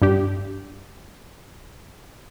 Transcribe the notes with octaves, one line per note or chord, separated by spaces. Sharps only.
G2 D4 G4